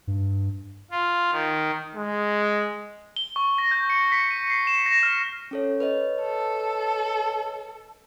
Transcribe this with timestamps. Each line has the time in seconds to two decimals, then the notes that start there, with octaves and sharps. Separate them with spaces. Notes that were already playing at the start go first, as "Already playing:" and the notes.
0.07 G2
0.91 F4
1.31 D#3
1.95 G#3
3.16 G7
3.36 C#6
3.58 A#6
3.71 G6
3.90 C#7
4.12 B6
4.31 D#7
4.50 C7
4.67 E7
4.86 A#6
5.03 F6
5.51 C#4 A4 C#5
5.80 B4 C#5 D#5
6.22 A4